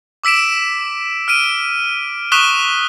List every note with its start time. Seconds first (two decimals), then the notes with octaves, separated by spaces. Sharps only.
0.24 D6 E6 B6 D7 E7
1.28 F6 D7 D#7
2.32 C#6 D#6 F#6 B6 E7 G7